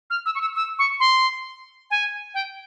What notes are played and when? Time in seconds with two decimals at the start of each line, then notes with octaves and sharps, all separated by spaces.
0.10 F6
0.26 E6
0.35 C#6
0.41 E6
0.56 E6
0.79 C#6
1.00 C6
1.91 G#5
2.34 G5